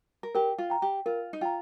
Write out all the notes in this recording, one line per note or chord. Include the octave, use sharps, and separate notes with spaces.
A#4
G4 A#4
F4
G5 A#5
G4
F4 A#4
D#4
F4 G5 A#5